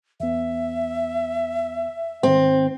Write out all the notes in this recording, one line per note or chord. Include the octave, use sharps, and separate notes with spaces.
E2 B3 E5
G#2 D#3 C4